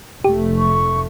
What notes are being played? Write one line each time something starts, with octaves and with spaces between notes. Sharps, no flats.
F1 A3 G4
C#6